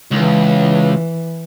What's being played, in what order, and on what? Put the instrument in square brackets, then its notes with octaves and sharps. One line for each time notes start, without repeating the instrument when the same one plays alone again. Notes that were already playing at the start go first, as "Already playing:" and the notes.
[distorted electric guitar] C#2 [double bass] E3